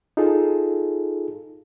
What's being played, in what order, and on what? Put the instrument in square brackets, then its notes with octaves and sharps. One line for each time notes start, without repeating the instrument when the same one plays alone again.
[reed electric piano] D#4 F4 G#4 A4